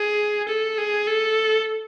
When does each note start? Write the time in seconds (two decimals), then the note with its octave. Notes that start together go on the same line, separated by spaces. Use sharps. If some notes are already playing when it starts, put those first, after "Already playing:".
Already playing: G#4
0.48 A4
0.78 G#4
1.07 A4